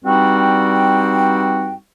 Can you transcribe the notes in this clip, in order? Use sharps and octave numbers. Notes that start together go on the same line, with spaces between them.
G2 G3 C4 D#4 F#4 G5